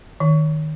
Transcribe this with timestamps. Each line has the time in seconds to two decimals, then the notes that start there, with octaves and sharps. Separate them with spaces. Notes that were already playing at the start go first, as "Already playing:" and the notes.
0.20 D#3